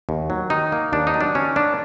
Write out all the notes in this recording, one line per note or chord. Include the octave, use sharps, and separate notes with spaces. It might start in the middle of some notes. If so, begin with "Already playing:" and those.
D#2
F#3
D#3 D#4
A#3
D#2 D4
D#4
F#3
D4
D#3 C#4
A#3 D4